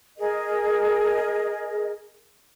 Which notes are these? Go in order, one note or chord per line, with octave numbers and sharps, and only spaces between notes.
G#4 A#4 D#5